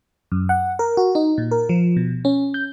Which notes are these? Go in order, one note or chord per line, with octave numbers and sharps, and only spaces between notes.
F#2
F#5
A#4
F#4
D#4
A#2
A#4
F3
B2
C#4
G6